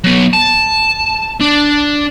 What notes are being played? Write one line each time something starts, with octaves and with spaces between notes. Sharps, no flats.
F#3 B3
A5
D4